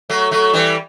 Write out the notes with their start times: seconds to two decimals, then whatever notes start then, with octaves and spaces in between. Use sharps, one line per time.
0.09 F#3 A3
0.31 F#3 A3
0.54 E3 G3